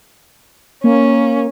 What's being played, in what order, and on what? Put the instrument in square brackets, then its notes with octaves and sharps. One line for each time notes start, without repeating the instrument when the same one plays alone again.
[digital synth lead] A#3 [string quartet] C#4